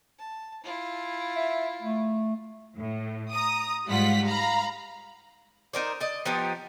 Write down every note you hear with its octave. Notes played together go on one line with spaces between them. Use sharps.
A5
E4 F4
E5
A3
A2
A#5 D#6
G#2 G3 F4 F#5 B6
F5 A#5 B5
D#4 A#4 C5 D5
D5 D#5
F3 B3 D#4 G4